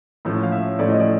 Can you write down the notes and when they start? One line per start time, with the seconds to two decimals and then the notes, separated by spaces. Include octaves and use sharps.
0.25 A2 F3 A3 C#4
0.43 F5
0.52 E5
0.79 A2 F3 A3 C#4 D5
0.90 D#5
1.00 D5